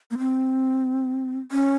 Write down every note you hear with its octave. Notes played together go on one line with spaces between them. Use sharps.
A#3
C4
C#4